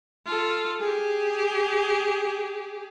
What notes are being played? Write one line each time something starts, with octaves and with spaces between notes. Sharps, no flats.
F4 A4
G4 G#4